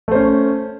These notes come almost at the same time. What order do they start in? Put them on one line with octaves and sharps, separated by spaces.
A3 C5 C#4